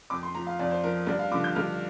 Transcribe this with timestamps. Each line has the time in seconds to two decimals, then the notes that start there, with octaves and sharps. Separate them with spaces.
0.10 F2 D6
0.23 C6
0.35 F3 A#5
0.47 F5
0.59 F2 D5
0.71 C5
0.84 F3 A#4
1.07 G2 D5
1.19 F5
1.31 F3 D6
1.34 D3
1.44 G6
1.55 G2 F6